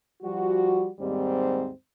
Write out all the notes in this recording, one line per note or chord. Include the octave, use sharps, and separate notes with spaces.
F3 G3 F#4
D#2 G#2 G3 C4